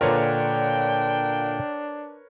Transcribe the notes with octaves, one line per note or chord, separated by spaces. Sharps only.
A#2 D3 D4 F4 A#4 B4 C#5 G5